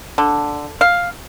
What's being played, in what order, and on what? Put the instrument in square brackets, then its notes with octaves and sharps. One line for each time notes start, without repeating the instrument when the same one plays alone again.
[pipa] D3
F5